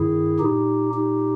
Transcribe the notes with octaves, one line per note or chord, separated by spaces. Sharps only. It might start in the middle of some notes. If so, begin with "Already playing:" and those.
Already playing: G2 D#3 E4 G#4
A#2 D#4 G4
D#4 G4